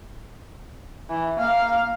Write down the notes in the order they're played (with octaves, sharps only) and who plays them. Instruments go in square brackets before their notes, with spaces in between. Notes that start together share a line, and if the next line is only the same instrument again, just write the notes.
[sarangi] E3
[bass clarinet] A#3 [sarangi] F5